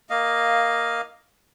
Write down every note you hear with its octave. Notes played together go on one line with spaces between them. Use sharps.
A#3 D#5 F5